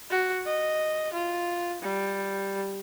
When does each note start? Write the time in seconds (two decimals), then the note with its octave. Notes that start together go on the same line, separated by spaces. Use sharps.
0.10 F#4
0.46 D#5
1.13 F4
1.82 G3